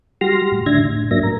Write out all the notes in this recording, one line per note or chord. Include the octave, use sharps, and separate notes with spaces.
G3 F#4 G4 C6 F6 A#6
A2
A2 D3 D4 E5 G#6 A#6
A2
G#2 F#3 A#3 D4 E5 A#6
A2 A#4